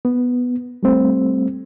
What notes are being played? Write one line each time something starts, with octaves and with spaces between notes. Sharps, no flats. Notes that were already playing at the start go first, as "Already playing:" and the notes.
B3
G3 A3 C4